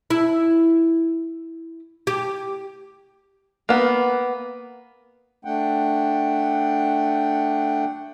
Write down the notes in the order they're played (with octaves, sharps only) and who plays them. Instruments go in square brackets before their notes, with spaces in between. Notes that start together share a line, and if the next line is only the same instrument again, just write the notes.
[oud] E4
G4
[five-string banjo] A#3 B3
[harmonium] A3 D4 F#5 G5